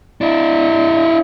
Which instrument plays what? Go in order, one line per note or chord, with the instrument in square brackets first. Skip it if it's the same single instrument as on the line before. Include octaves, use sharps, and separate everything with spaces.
[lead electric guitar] D4 E4